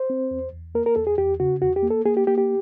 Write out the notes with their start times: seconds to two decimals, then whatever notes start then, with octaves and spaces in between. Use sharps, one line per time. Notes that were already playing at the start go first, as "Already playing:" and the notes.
Already playing: C5
0.10 C4
0.31 E2
0.52 E2
0.75 A#3 A#4
0.86 A#4
0.96 E2 A4
1.07 G#4
1.18 E2 G4
1.40 C#3 F#4
1.62 E2 F#4
1.76 G4
1.83 A#3
1.90 A4
2.05 A#3 G#4
2.17 G4
2.27 A#3 G4
2.38 G4